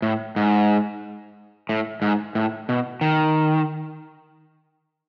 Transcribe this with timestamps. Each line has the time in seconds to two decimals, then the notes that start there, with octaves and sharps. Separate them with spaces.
0.02 A2
0.36 G#2
1.69 A2
2.02 G#2
2.35 A2
2.69 B2
3.01 D#3